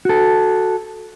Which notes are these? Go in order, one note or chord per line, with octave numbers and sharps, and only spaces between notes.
F#4 A4